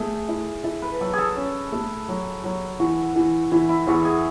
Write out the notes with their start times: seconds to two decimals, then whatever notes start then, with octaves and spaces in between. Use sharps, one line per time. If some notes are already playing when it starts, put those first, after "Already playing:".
Already playing: A3 G#4
0.29 E4
0.64 E4 A4
0.82 B4
1.01 F#3 A4
1.13 G#4 A4
1.36 C#4
1.72 A3
2.08 F#3
2.44 F#3
2.79 E3 F#4
3.16 E3
3.51 E3 E4
3.69 E4
3.87 E2 F#4
4.05 G#4